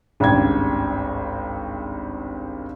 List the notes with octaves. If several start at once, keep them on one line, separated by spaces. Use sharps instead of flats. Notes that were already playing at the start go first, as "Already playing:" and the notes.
G#1 C#2 G2 G5 G#6